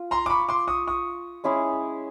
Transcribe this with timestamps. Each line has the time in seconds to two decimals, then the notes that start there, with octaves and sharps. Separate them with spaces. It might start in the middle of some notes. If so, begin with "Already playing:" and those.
Already playing: F4
0.11 A#5 C6
0.26 D6
0.30 B5 C#6
0.49 C6 D6
0.68 C#6 D#6
0.87 C#6 D#6
1.44 G#3 C#4 E4 G#4